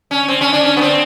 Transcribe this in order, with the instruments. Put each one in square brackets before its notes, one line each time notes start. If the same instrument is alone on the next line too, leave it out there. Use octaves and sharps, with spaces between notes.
[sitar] C#4
C4
C#4
D4
C#4
B3
C4